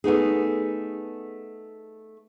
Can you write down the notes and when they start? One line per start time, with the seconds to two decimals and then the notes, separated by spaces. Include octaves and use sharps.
0.04 A3 B3 D#4 G#4